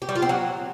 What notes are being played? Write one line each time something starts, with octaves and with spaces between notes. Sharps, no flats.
G4
G3
F4
C4
F#3